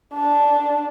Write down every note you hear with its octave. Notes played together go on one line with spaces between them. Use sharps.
D4